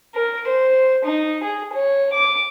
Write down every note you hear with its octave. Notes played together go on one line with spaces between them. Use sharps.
A#4
C5
D#4
G#4
C#5
D6